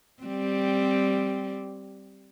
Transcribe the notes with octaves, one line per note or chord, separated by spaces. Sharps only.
G3 C4